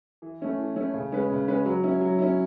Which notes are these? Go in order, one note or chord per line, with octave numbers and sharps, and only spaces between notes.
E3
A3 C#4 E4
E3
A3 C#4 E4
C#3
G#3 C#4 G#4 B4
C#3
G#3 C#4 G#4 B4
F#3
C#4 E4
F#3
C#4 E4